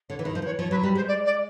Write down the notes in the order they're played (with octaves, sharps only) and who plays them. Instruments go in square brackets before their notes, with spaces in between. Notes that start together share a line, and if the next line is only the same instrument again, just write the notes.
[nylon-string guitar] D3 [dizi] C#5
[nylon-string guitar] E3 [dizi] B4
[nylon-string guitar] D#3
[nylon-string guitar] F3 [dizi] C5
[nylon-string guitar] E3 [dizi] C#5
[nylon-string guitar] F3 [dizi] C#5
[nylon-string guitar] F#3 [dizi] B4
[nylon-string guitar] G3 [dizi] B4
[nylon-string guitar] G#3 [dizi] C5
[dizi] D5
D5